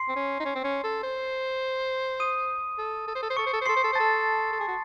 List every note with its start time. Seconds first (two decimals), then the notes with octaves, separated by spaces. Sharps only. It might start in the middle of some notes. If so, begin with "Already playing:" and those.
Already playing: C6 C7
0.09 C4
0.16 C#4
0.40 D#4
0.45 C#4
0.56 C4
0.65 C#4
0.84 A4
1.03 C5
2.20 D#6 D#7
2.79 A4
3.08 A4
3.15 C5
3.23 A4
3.30 C5
3.36 A4 C#6 C#7
3.47 C5
3.54 A4
3.62 C5
3.66 A4 C6 C7
3.76 C5
3.84 A4
3.93 C5
3.95 A4 A5 A6
4.53 A4
4.60 G#4
4.68 F#4